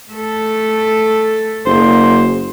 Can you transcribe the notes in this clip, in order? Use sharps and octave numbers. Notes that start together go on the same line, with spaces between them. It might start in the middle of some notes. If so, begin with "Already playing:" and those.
A3 A4
F#1 C5